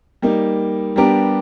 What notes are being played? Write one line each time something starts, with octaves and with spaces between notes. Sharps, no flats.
G3 A#3 D#4
G3 B3 D4 G4 A#4